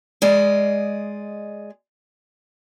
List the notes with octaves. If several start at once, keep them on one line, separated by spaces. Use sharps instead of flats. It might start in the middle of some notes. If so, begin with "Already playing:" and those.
G#3 D5 D#5